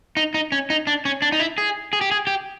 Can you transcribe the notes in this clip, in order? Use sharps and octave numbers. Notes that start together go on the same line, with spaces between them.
D#4
D#4
C#4
D#4
D4
C#4
D4
D#4
E4
G#4
G#4
G4
G#4
G4